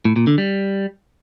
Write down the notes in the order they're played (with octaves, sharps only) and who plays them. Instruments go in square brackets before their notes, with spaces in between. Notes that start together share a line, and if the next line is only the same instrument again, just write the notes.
[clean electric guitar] A2
A#2
D3
G3